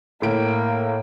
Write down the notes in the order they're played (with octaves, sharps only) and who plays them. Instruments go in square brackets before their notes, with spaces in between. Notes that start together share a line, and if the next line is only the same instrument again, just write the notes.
[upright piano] A2 D7 [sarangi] A#3